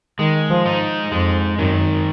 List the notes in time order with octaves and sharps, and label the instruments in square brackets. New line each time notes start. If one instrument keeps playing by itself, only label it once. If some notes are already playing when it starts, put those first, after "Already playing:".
[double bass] D#3 [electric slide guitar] G#3
[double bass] F3
[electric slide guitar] D#4
[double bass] F2 [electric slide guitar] G#3
[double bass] F#2 [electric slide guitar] D#3